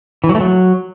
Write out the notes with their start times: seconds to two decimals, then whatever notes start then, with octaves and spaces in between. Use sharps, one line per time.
0.24 E3
0.29 F#3
0.35 A3
0.41 F#3